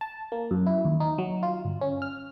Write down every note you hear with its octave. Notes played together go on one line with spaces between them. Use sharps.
A5
A#3
F#2
E4
D#2
D#4
F#3
F4
G1
C#4
F6